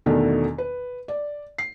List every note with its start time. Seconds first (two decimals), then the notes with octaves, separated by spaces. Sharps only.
0.06 E2 B2 D3 D#3 A3 D4
0.58 B4
1.08 D5
1.58 C7